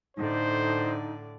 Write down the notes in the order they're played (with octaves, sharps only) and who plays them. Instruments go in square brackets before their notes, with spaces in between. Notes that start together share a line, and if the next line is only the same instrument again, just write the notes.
[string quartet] A2 D3 D5 [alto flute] D#4 [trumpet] C5